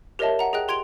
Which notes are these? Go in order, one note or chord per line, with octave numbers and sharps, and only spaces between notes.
G4 A#4 C#5 D#5 E5 A5
F#5 A#5
G#4 D#5 G5 F#6
G4 C6 G#6 D7 F7